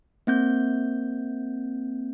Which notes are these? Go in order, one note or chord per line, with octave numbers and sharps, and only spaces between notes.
A#3 C4 G6